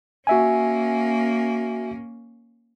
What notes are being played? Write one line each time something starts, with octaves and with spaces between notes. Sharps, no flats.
A#3 C#4 F#4 E5 G#5